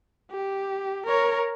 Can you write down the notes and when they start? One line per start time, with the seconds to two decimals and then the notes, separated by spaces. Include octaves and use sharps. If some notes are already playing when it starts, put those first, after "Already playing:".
0.31 G4
1.07 A#4 C#5